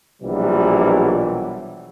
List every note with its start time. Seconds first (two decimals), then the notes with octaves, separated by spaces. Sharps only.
0.22 A#1 B2 E3 F#3 G3